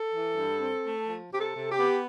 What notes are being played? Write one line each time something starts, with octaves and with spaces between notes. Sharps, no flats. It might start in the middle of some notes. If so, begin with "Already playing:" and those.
Already playing: A4
E3
G2
C4
A3
F3
C3 G4
A4
C3
G4
B3